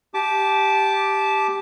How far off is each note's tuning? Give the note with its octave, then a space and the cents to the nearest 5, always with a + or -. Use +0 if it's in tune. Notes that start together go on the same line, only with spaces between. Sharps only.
G4 +0 A5 -20 D6 +0